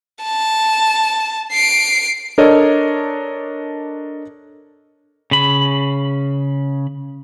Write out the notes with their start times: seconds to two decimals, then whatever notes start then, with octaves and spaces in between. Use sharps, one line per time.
0.23 A5
1.52 C7 D7
2.38 D4 A4 A#4 C#5 D#5
5.31 C#3 B5